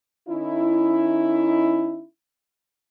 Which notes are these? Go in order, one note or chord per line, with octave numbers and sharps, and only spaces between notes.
D#3 C#4 D#4 E4